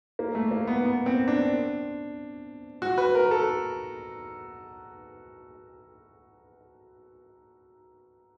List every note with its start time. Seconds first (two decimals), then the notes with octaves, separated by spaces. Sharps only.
0.19 A#3
0.35 A3
0.51 A#3
0.67 B3
0.85 B3
1.06 C4
1.28 D4
2.82 F#4
2.98 B4
3.15 A#4
3.31 A4